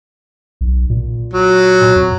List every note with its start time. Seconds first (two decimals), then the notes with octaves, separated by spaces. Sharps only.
0.61 B1
0.90 A#2
1.34 F#3
1.96 F2